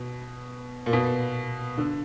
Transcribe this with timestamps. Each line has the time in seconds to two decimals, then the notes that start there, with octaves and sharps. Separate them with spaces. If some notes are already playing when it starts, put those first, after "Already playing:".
Already playing: B2
0.86 A#2
0.93 B2
1.78 D3